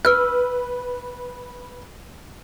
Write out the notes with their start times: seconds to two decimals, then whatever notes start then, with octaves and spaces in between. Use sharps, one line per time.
0.05 B4 E6 F6